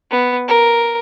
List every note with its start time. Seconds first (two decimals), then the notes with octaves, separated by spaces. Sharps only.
0.11 B3
0.48 A#4